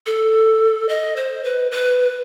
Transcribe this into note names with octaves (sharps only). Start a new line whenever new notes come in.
A4
D#5
C5
B4
B4